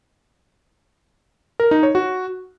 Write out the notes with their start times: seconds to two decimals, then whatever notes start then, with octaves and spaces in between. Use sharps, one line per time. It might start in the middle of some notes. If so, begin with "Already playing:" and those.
1.60 A#4
1.71 D#4
1.83 C#5
1.95 F#4